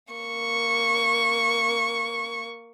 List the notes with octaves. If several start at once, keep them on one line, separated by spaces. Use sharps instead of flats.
A#3 C#6